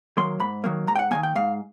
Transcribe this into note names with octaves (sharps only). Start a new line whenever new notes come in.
D#3 F#3 A#3 C6
G#2 B5
D#3 F#3 A#3
G#2 A#5
G5
F#5
D#3 F#3 A#3 G#5
G5
G#2 F5